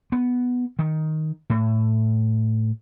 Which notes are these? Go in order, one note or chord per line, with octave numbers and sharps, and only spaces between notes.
B3
D#3
A2